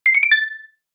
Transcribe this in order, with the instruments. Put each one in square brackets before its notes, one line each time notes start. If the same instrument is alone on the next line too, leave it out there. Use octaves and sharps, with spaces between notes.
[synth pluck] C7
C#7
D7
A6